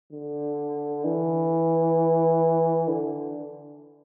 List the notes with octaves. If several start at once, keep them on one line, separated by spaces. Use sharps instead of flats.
D3
E3
D3